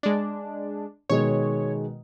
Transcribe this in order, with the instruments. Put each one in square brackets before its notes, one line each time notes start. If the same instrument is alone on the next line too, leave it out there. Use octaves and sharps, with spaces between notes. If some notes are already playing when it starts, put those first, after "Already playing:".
[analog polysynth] G#3 D4
[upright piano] B2 D#3 G#3 [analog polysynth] C#5